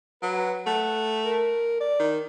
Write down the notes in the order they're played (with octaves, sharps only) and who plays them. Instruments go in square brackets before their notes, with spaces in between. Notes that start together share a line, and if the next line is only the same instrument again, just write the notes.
[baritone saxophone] F#3 [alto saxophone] B4
[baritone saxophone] A3 [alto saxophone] F#5
[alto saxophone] A#4
D5
[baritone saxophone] D#3